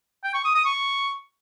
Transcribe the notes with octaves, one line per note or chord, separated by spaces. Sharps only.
G5
C#6
D#6
D#6
C#6